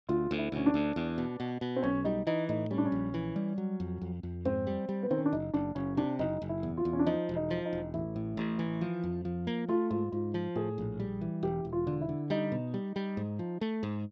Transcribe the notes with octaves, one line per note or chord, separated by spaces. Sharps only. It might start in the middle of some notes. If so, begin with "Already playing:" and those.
D2 F4
D2
E4
D2 C#4
D4
D2
E2
B2
B2
B2
C4
B1 C#4
G3 D#4
E3 D#4
A2 D#4
G3 C#4
D4
C#4
A#1
E3
G3
F#3
F2
F2
F2
G#2 C4
G3
G3
B3
D#3 C4
C#4
D4
F#1 D#4
F#1 D4
F#1 C#4
C3 D4
F#1 D#4
F#1
E4
E2
F4
E2
C#4
D4
F3 D#4
E1
D#4
F3
D#4
E1
A1 E4
A2
A1
E3
F3
F2
F3
A#3
A3 F4
G#2 F4
G#2 F4
F3
A2 G#4
A#1
G3
E3
E1 G4
E1
F4
D3
E4
D3
G3 D#4
B2
G3
G3
G#2
F3
A3
G#2